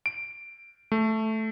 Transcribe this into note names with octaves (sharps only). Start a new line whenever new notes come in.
D7
A3